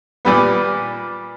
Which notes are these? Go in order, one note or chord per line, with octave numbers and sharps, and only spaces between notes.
A#2 G3 B3